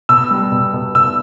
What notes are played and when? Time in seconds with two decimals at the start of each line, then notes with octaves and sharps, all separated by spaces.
0.09 B2 E6
0.31 G3
0.52 B2
0.74 B2
0.95 B2 E6